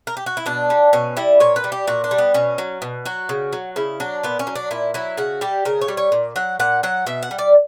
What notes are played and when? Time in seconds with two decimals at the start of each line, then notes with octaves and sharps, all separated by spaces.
0.07 A#4
0.17 G4
0.26 F#4
0.37 E4
0.46 B2 D4
0.70 G3
0.93 B2 C#4
1.17 G3 E4
1.40 A#2 C#5
1.56 B4
1.64 G3
1.72 G4
1.87 A#2 F#4
2.04 D4
2.11 G3
2.18 B3
2.34 B2 C#4
2.58 F#3
2.82 B2
3.05 F#3 F#4
3.29 C#3
3.53 F#3
3.76 C#3 E4
4.00 F#3 D4
4.23 A#2 B3
4.39 C#4
4.47 F#3
4.55 D4
4.71 A#2 E4
4.94 F#3 E4
5.17 C#3 F#4
5.41 G3 G4
5.65 C#3 A#4
5.81 C#5
5.88 G3
5.97 C#5
6.12 A#2
6.36 F#3 F#5
6.60 A#2 F#5
6.83 F#3 F#5
7.07 B2 E5
7.23 F#5
7.31 G3
7.38 D5